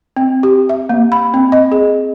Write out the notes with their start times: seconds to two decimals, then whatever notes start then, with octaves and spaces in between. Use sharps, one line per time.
0.16 C4
0.43 G4
0.69 E5
0.89 A#3
1.12 B5
1.34 C4
1.52 D#5
1.72 G#4